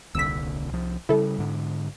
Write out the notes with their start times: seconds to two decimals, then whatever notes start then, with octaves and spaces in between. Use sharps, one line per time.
0.15 D#1 C2 D3 E6 B6
0.72 C2 F3
1.09 C#3 F#3 G3 E4 A4
1.38 G#2 D3